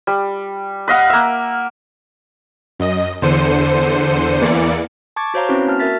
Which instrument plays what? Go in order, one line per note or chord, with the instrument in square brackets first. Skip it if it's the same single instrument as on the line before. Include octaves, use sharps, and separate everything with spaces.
[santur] G3
B4 D#5 F5 F#5
A#3 E5
[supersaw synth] F#2 D#5
E2 D3 C5 C#7 D#7
E2 E3 A#3 D5 C#7
[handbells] A5 C#6 D6 G#6 A6
F#4 C5 C#5 F5 A#5
C4 C#4 E4 F#4 B4
A#3 A5 F6
F#4 A#4 E5 A6 B6